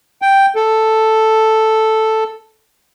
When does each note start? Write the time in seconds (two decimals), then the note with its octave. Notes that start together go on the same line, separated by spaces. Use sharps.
0.22 G5
0.56 A4